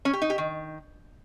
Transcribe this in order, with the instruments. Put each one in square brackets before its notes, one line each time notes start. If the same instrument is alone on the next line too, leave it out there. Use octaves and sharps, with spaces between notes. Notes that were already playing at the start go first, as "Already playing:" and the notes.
[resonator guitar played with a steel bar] C#4
G4
D#4
G4
D#3